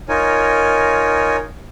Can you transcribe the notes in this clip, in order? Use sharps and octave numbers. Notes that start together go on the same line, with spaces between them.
D#4 F4 A#4 C#5 G#5